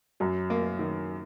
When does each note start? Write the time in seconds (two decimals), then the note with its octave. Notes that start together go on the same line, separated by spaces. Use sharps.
0.20 F#2 F#3
0.50 A#3
0.79 D#3